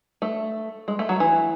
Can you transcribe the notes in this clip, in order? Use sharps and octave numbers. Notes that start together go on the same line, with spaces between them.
A3
G#3
A3
F#3
E3